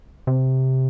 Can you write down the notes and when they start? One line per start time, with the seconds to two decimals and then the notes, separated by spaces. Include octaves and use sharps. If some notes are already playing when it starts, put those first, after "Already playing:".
0.27 C3